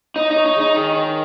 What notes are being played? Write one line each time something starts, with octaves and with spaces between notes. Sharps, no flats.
D#4 C#5
D#4
C#5
D#4
G#3 D#4
D#3 G#4
C#5